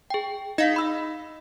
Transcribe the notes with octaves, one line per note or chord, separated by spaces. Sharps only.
G#4 G5
D#4 D#5 F5 B6
B5 E6